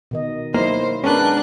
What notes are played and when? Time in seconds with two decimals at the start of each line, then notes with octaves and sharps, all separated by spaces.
0.11 B2 D#3 D#5
0.54 F#3 A#3 D#4 E4 C5
1.04 G#3 B3 C#4 D4 A#4 B4 F#6